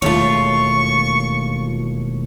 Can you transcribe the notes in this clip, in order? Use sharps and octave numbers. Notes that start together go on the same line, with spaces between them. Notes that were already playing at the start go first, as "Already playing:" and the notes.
E1 D#2 A3 F4 C#5 C#6